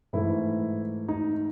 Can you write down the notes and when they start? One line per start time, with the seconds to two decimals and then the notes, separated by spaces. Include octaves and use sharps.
0.13 G#2 E3 A3 E4
1.08 D#4